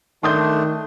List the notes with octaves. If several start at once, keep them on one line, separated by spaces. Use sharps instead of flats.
D#3 A3 D4 C6 D#6 G6